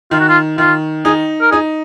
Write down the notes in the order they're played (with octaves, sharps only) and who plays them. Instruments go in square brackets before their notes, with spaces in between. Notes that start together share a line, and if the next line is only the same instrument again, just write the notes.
[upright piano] D#3 [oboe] F4
[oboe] F#4
F4
[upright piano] D#3 [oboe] F4
[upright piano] D#4 [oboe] G#4
[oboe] A#4
[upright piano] D#4 [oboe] G#4